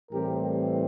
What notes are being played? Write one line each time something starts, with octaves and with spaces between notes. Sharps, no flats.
A2 E3 G3 C4 G4 A#4